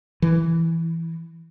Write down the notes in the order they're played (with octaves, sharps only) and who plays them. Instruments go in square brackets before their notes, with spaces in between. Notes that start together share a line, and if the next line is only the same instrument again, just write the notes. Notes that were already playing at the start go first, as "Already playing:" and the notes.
[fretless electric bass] E3